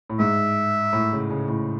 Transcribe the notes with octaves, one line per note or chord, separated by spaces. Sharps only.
A2
G#2 E5
A2
C#3
C#3
A2